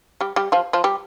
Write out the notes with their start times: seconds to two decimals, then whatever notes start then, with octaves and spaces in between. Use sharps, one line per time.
0.21 G3 G4
0.36 G3 G4
0.52 F3 F4
0.73 F3 F4
0.84 G3 G4